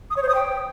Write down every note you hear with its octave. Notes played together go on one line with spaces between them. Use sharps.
D#6
C#5
C5
D#6
G5